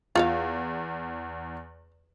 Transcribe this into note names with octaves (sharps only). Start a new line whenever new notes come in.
E2 F4 C#5 F5